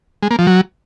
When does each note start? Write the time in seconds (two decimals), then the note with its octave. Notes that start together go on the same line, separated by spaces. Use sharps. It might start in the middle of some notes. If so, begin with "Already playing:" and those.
0.23 G#3
0.31 A#3
0.39 F3
0.47 F#3